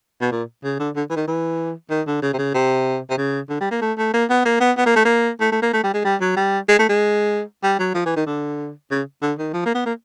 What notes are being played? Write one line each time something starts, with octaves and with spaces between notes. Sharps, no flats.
B2
A#2
C#3
D3
D3
E3
D#3
E3
D#3
D3
C#3
C3
C#3
C3
C3
C#3
D3
G3
A#3
A3
A3
A#3
B3
A#3
B3
B3
A#3
A3
A#3
A3
A3
A#3
A3
G3
G#3
G3
F#3
G3
G#3
A3
G#3
G3
F#3
F3
E3
D#3
D3
C#3
D3
D#3
F3
A#3
B3
A#3